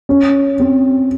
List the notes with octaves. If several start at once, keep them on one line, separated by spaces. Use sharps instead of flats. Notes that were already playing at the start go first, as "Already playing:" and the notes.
C#4
C4